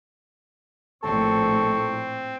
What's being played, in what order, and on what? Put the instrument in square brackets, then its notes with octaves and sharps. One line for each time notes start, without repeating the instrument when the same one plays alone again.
[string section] A#1 A2 [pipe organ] C4 [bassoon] A4 [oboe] C#6